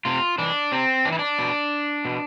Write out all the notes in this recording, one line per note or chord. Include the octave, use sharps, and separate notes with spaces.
C3 F4
E3 D4
C3 C4
E3 D4
E4
D4
B2
B2